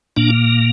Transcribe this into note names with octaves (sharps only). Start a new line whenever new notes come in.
A#2 A#3 D4